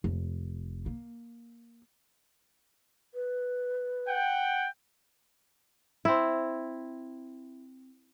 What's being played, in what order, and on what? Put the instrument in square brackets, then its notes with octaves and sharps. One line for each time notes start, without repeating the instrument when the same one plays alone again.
[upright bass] F1
A#3
[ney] B4
[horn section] F#5 G5
[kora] C4 E4